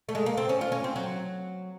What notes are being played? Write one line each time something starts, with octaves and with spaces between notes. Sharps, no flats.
A3
G#3
A#3
C4
C#4
F4
C#4
C4
F#3